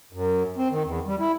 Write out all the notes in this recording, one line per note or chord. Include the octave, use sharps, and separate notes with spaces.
F#2
C4
D#3
E2
G3
E4